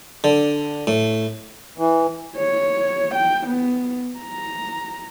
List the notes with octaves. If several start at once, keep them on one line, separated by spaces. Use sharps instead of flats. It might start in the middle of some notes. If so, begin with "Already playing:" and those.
D3
A2
E3
C#5
G5
B3
A#5